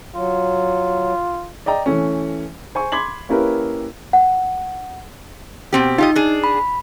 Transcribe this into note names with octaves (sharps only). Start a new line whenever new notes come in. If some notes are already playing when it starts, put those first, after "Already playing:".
F#3 F4
D5 D#5 G5 A#5
E3 A3 C#4
C5 G#5 C#6
B5 C6 D6 G#6 B6 F#7
A#3 C#4 E4 G4 A#4 B4
F#5
B2 C4 G4
D#4 F4 G4 D#5
D4 G#4
B5